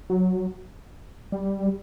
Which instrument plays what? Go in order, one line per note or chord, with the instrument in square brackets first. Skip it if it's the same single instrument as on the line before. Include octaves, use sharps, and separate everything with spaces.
[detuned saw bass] F#3
G3